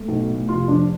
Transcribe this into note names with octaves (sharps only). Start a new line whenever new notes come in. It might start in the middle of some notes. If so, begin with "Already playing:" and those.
Already playing: A3
B1
A2
F1 F4
F3 D4